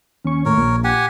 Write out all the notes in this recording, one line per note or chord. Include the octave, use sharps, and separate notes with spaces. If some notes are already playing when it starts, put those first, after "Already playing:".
D#2 C#4 C#6
A2 A#4 C#5
A#1 A#2
G4 F#5 G#5